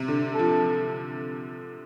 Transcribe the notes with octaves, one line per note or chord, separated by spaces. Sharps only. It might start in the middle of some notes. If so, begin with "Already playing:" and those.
Already playing: C3
D3
A4
F3